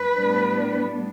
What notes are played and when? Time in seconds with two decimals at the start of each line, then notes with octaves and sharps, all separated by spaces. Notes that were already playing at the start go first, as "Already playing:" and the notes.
Already playing: B4
0.15 A2 G3 B3 D4